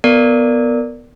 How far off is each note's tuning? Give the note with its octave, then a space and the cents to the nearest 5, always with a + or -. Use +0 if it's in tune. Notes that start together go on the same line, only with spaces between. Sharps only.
B3 +0 A#4 -25 D5 +0